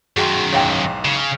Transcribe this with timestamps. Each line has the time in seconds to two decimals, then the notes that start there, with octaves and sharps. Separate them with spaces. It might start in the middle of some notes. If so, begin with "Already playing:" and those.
0.17 F#2 D#3 F#4 G#4 G5 C6
0.53 B1 E2 G#2 C#5 F5 G5
1.05 C#3